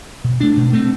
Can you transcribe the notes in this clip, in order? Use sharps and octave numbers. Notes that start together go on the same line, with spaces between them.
B2
A3 D4
B2
A3 C4